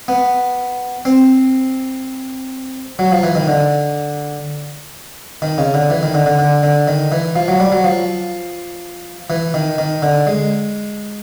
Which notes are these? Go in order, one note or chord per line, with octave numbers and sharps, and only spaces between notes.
B3
C4
F#3
F3
E3
D#3
D3
D#3
C#3
D3
E3
D#3
D3
D3
D3
D3
D#3
E3
F3
F#3
G3
F#3
F3
E3
D#3
D#3
D3
G#3